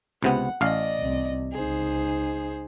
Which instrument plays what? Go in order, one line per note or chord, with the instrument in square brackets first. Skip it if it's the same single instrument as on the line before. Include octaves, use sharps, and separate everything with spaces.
[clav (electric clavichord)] C#2 C3 B3 [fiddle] F#5
[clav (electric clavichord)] A1 F5 [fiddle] D5 D#5
[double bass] C2 C3
[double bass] C#2 D#4 [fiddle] G#4 C5